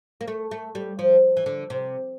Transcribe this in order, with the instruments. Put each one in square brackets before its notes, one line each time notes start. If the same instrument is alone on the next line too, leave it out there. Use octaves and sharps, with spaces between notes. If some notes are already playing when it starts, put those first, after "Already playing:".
[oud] A#3
A3
A3
G3
F3
E3
D3
C3